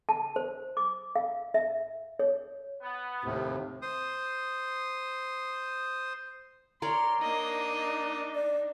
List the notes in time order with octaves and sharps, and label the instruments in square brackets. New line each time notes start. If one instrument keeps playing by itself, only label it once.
[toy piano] A5
C5
D6
F5
E5
C#5
[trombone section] B3
[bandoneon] D#2 A2 [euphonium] C3
[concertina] C5 D#6
[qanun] A#4 C#5 D5 [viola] C6
[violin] A#3 D#5 [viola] D4 D#4
[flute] D5